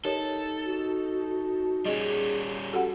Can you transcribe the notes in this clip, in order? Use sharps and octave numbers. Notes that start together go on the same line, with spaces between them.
D#4 G4 A4 A#4 C#5
F#4
G3 C#4 G#4 D#5
F#4 G4 A4 F#5